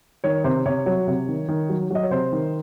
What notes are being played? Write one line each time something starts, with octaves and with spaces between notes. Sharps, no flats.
D#3 C#5
C3 C5
C3 C#5
F#3 C#5
C3
D#3
D#3
F#3
F#3 D#5
C#5
C3 C5
D#3